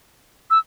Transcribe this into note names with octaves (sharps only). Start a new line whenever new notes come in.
E6